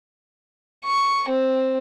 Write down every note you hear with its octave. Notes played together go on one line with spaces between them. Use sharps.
C#6
C4